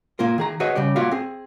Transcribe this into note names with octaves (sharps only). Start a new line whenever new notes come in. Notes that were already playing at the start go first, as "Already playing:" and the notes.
A#3 E4 F4 A#4
D#3 G#4 A#5
F#4 G#4 B4 C#5 D#5 E5
C#3 G3 G4 D5
A#3 F4 F#4 D5 E5 F5
C4 G#4